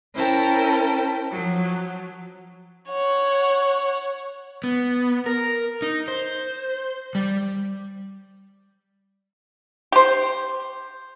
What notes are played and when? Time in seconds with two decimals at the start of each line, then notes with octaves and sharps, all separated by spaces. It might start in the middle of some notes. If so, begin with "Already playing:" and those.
0.14 C#4 E4 A#4 C5 G5 A5
1.31 F3 F#3
2.89 C#5 F#5
4.64 B3
5.26 A#4
5.82 D#4
6.08 C5
7.15 G3
9.92 G4 C5